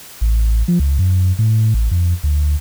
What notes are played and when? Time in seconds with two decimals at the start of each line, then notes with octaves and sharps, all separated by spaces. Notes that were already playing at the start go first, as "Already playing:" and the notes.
0.21 A1
0.68 F3
0.79 C#2
0.99 F#2
1.39 A2
1.74 A1
1.91 F2
2.23 D2